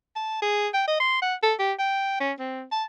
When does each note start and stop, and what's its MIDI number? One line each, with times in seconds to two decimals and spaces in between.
0.16 0.41 81
0.42 0.68 68
0.74 0.83 79
0.87 0.99 75
1.00 1.21 84
1.22 1.35 78
1.43 1.54 69
1.59 1.73 67
1.79 2.20 79
2.20 2.32 61
2.39 2.64 60
2.72 2.84 81